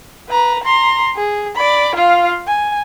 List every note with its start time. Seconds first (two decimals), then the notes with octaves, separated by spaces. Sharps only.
0.29 B4 A#5
0.63 A#5 C6
1.16 G#4
1.56 D5 B5
1.95 F4 F5
2.48 G#5